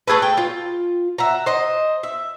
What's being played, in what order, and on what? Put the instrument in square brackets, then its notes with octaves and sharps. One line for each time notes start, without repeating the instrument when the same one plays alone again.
[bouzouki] A3 G#4 A4 B4
G5
F4
E5 F#5 A#5
C5 D#5
E5